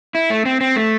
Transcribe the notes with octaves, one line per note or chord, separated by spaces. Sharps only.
E4
A3
C4
C4
A3